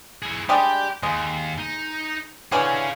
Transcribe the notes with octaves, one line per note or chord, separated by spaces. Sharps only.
E4 G#4
G3 G#3 D4 G4 G5
D#2 G#3
D#4
D3 E3 C#4 G#4 F5